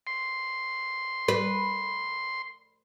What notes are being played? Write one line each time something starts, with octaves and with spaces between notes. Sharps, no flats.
C6
B4